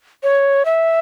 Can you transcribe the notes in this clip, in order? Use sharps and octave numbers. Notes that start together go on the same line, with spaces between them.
C#5
E5